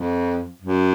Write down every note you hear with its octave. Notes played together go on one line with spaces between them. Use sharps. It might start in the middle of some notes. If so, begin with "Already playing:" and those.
Already playing: F2
F#2